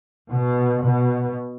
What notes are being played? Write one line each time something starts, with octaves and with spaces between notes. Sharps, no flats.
B2
B2